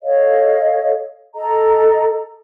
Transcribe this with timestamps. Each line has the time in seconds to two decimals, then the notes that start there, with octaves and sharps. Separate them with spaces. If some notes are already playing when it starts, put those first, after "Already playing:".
0.03 A4 C#5 D#5 F5
1.35 A4 D#5 A#5